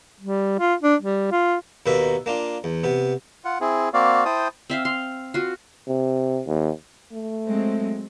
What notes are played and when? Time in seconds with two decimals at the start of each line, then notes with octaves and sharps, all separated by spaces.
0.20 G3
0.59 F4
0.83 D4
1.02 G3
1.31 F4
1.86 D#2 B2 A#3 B4 E5
2.26 A#3 D4 F4
2.64 E2
2.84 C3 B3
3.45 F4 F#5
3.61 C4 E4 G#4
3.93 A#3 C4 F#4 D5 F5
4.25 E4 C5 G5 A5 D#6
4.70 C4 E5 F5
4.85 F5 C6
5.34 F4 F#4
5.88 C3
6.47 D#2
7.13 A3
7.47 F#3 G#3 C4